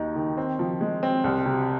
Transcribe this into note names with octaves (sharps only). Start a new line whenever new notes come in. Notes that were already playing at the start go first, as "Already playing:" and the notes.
Already playing: D#2 D#4
D#3
C4
F3
G#3
C4
C2
C3